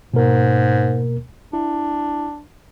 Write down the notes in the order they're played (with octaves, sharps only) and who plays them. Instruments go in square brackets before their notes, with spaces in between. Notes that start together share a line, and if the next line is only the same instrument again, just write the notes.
[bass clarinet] G#2 [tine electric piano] B2 A#3 A#4
[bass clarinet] D4 [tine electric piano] E4